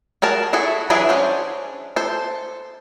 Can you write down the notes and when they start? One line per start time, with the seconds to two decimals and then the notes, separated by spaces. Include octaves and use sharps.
0.22 F#4 G#4 A#4 A5
0.53 E4 F#4 G#4 A4
0.90 E3 F#3 D4 E4 G#4
1.09 C#4 D4 C5
1.96 A4 C5